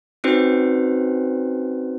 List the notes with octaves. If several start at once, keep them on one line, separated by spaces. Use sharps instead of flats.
C4 C#4 D#4 F#4 B4 C5